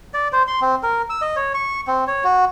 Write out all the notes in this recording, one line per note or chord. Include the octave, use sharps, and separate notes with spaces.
D5
C5
C6
C4
A#4
E6
D#5
C#5
C#6
C4
C#5
F#4